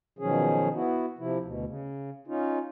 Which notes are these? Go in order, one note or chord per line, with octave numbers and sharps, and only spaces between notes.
B2 D#3 F3 F#3 C#4 G#4
B3 E4 F#4
C3 F3 E4
D2 B2
C#3
C#4 D#4 F4